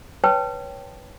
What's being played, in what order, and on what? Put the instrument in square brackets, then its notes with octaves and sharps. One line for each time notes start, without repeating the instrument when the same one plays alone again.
[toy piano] B4 C#5 G5 A5